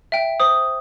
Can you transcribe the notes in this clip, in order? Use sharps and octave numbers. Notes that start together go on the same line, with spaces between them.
E5 G5
C5 D#6